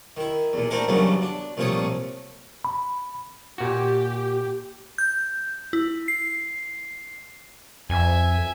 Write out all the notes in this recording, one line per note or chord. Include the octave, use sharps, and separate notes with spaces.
D#3 E4
E2 A#2
A3 C4 D4 E4 A4 A#4
E2 G2 C#3 F#3 A3 B3
D4
C2 A#2 F3 A3 C#5 D#6
B5
A#2 F#4 G4
G6
E4
C7
F2 E5 G#5